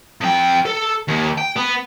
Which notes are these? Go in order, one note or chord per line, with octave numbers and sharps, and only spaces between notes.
F2 G5
A4
D#2
G5
B3